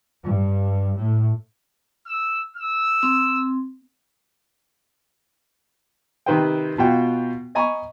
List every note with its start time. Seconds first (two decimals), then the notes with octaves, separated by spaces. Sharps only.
0.22 G2
0.96 A2
2.07 E6
2.56 E6
3.03 C4
6.26 C3 D#3 B4 C5 G5
6.78 B2 F4 F#4 G5
7.55 D#5 G#5 A#5 B5 C#6